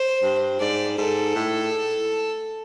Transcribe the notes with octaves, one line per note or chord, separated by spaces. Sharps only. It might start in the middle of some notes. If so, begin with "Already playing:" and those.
Already playing: C5
G2
G#2 D5
G#2 A4
A2